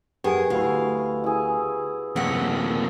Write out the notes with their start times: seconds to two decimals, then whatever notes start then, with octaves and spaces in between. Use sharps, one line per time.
0.24 F#2 B3 G4 G#4 G#5
0.50 D2 E4 F#4 F5
1.24 E4 G#4
2.16 F#2 C3 A#3 F#5